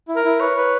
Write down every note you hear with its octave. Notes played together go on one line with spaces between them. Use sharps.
E4
A#4
E4
B4 C#5
B4